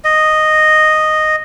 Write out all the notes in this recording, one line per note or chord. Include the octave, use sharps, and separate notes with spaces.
D#5